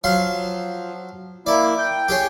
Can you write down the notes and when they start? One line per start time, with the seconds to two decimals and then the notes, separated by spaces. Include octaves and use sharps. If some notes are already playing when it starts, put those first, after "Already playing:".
0.04 F3 F#3 F5 C6
1.46 A#3 E4 D5
1.78 G5
2.08 G4 G#4 C#5